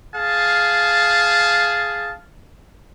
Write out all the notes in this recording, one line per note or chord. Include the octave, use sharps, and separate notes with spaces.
G#4 F5 A5